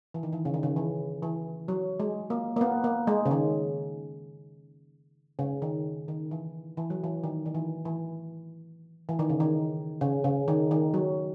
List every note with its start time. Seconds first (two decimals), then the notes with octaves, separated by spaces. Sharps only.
0.14 E3
0.23 D#3
0.33 E3
0.45 C#3
0.54 D#3
0.63 C#3
0.76 E3
1.23 E3
1.68 F#3
2.00 G#3
2.30 A#3
2.56 A#3
2.61 B3
2.84 A#3
3.07 G#3
3.26 C#3
3.31 D#3
5.39 C#3
5.62 D#3
6.08 D#3
6.31 E3
6.77 E3
6.90 F#3
7.04 E3
7.24 D#3
7.46 D#3
7.55 E3
7.85 E3
9.09 E3
9.19 D#3
9.29 C#3
9.40 D#3
10.01 C#3
10.24 C#3
10.48 D#3
10.71 D#3
10.94 F#3